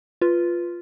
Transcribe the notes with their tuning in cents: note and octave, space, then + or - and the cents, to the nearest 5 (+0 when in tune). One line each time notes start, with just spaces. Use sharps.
F4 -5 B4 +0